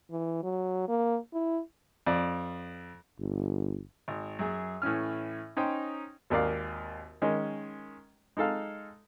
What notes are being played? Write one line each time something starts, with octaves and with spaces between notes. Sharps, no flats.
E3
F#3
A#3
E4
F2 D5
G1
G#1
F#2 G#4
A2 E3 C#4 F6
C#4 D#4 C5 G5
G#1 D#2 A#4 D5 F5
D#3 G#3 C#4
G#3 D#4 A4 F5